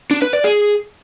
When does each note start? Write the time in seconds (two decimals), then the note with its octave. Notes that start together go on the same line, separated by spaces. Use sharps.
0.11 D4
0.22 B4
0.33 D5
0.44 G#4